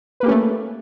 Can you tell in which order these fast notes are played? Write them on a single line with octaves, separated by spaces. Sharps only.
B4 A#3 G4 C#4 A3